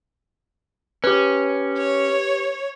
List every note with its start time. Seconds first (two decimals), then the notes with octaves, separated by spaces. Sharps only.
1.04 C#4 G4 B4
1.77 C#5